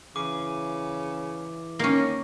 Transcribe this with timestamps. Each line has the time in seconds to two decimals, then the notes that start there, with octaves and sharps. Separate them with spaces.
0.16 C#3 E3 D6
1.79 D#3 A#3 C#4